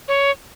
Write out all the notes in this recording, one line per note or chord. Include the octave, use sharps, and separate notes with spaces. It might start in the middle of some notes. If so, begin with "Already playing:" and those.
C#5